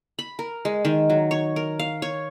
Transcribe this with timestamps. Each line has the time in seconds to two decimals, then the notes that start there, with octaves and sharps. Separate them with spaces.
0.19 B5
0.39 A#4
0.65 G#3
0.85 D#3
1.10 F#3
1.31 C#5
1.56 A#4
1.79 F5
2.02 C#5